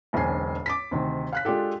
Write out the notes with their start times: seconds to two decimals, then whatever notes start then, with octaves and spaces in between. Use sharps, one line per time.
0.13 E1 B1 D3 C4 G#5 C7
0.66 D6 A6 B6
0.91 D2 C3 D#3
1.33 F5 F#6 B6
1.45 G#3 D4 F4 G4 A4